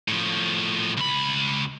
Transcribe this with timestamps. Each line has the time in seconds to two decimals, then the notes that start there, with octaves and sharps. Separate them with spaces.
0.08 A2 F3
0.97 C#2 B5